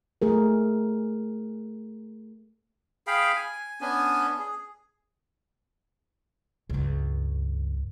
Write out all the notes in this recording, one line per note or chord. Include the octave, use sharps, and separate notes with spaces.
A3 G#4 A#4
G#4 F5 G5 B5
G#5
B3 C#4 D4 G#5
G#4
C#2 G2